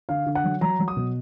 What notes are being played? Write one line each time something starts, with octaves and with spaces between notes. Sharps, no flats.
D3 F5
D3
F#5
F#3
F#3 A#5
F#3
D#6
B2